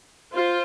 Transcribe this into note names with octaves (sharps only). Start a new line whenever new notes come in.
F4 C5